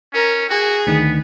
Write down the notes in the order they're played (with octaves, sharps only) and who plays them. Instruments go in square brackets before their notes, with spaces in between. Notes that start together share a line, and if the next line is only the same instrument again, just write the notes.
[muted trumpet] C#4 [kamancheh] A#4
[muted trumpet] F#4 [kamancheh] G#4
[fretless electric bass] D2 D#3 [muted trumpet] B3